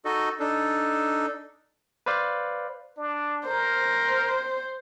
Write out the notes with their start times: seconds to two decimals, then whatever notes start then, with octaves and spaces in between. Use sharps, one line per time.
0.05 D#4 F#4 A4 D#5
0.40 D4 D#4 A4
2.06 B4 C5 D5 F5
2.98 D4
3.46 A#4 C5